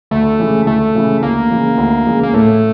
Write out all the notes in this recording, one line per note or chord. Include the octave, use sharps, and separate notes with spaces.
D2 A3
C#3 E3 G#3
D2 A3
C#3 E3 G#3
D2 A#3
C#3 E3 G#3
D2
C#3 E3 G#3
A#3
A2 A3